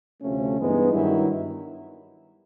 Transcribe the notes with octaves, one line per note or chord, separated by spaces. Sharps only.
D2 C3 F3 A3 C#4
G2 E3 G#3 B3 D#4
G2 D#3 F#3 B3 E4